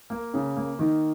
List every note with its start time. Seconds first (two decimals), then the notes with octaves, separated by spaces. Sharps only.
0.10 A#3
0.34 C#3
0.57 A#3
0.79 D#3